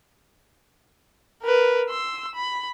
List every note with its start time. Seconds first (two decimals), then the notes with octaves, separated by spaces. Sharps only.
1.43 A#4 B4
1.89 C6 E6
2.35 B5